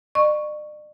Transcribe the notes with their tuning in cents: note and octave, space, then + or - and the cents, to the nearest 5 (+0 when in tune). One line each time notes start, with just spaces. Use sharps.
D5 +45 C#6 +0